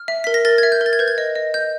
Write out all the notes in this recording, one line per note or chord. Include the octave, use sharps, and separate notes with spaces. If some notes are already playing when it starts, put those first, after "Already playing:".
Already playing: F6
E5
A#4 B6
A#6
A#4 A6
E5 G#6
G6
A#4
A6
G#6
B4 G6
G#6
D#5
D#5
D#5 G6